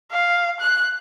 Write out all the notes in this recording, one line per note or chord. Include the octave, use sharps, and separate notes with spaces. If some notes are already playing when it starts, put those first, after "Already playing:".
F5
F#6